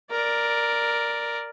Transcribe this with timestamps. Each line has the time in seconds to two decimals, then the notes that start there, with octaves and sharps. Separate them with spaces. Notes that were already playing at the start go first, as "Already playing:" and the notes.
0.11 A#4 D5